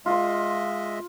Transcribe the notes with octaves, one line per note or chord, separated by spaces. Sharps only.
G#3 F4 D#5 E5 C6